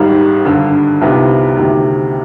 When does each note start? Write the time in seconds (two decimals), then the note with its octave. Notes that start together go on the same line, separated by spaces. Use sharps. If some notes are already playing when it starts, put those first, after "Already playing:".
Already playing: G#1 G#2 D#3 G3
0.45 G#1 G2 D3
1.01 C2 C3 D#3 B3 F4
1.56 D2 C3 D#3